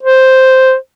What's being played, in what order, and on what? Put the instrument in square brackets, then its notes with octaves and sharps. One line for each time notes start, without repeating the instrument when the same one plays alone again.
[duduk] C5